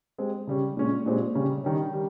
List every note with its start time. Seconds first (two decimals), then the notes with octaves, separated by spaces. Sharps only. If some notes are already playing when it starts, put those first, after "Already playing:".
0.18 G#3 C4 G4
0.47 C#3 G3 C#4
0.77 A#2 G#3 C#4
1.06 A#2 G#3 C4 G4
1.35 C#3 G3 C#4
1.64 D#3 G3 C#4
1.93 G3